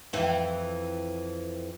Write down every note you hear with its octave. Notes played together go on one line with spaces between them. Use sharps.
F2 E3 E4